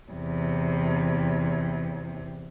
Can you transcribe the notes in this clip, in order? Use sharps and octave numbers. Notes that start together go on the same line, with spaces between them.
E2 C3